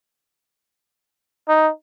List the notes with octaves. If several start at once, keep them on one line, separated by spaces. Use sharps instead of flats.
D#4